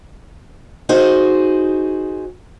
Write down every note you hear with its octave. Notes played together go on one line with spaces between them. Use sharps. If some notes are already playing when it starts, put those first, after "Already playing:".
D#4 F#4 G#4 C5